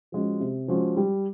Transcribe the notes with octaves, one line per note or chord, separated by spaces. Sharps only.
F3 G#3 C#4 F#4
C3
F3 G#3 C#4 F#4
G3